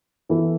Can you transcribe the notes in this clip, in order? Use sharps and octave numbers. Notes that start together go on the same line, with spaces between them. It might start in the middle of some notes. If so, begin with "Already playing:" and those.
E3 B3 E4 A4